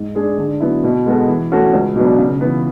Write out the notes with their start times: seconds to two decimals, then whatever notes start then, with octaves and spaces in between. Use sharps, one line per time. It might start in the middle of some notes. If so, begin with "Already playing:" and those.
Already playing: G#2
0.15 G#3 D4 G#4
0.38 D3
0.60 F#3 B3 E4
0.83 B2
1.06 G#3 B3 F#4 A4
1.28 E3
1.51 A3 C#4 F#4 A4
1.74 C#2
1.95 B2 F#3 B3 D4
2.18 C#3
2.41 E3 B3